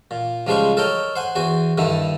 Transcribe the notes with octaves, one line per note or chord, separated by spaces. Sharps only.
A#2
C#2 F3 G3 G#3 C5 C#6
A4 A#4 C#5 D#5 G5
C5 F#5 G#5
E2 F#4 C5 G#5
G2 D3 D#3 E4